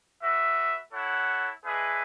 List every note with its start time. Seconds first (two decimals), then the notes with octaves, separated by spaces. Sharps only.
0.20 F#4 B4 E5
0.93 E4 A4 C#5 F#5
1.64 G#3 D4 G#4 B4 E5